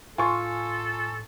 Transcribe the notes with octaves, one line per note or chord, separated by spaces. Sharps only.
A2 F4 A4 G#5 C6 C#6